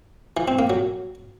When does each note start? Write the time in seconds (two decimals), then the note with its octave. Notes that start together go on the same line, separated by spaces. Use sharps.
0.37 E3
0.48 C4
0.59 A#3
0.70 F#3